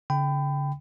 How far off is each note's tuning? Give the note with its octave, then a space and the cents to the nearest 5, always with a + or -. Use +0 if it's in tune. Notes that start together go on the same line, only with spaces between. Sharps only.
D3 -45 G5 +0 B5 +30